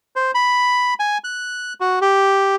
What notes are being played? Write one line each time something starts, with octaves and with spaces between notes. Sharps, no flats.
C5
B5
G#5
F#6
F#4
G4